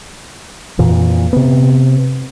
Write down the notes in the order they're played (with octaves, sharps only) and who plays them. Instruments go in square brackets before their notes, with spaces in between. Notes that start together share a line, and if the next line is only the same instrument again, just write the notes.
[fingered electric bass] F2 A#2 E3
C3 B3